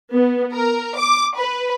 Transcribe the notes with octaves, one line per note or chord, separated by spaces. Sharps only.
B3
A#4
D6
B4